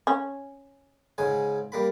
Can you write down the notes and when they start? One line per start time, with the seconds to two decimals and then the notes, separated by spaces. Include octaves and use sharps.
0.07 C#4
1.18 G#2 C#3 G#5
1.72 G3 A#3 B5